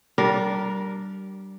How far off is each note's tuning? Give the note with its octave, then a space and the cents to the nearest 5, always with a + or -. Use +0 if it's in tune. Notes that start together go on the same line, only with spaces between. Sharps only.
G3 -25 D4 +0 A#4 +0